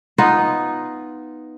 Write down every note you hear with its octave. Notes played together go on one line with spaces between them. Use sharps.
B3 D#4 F4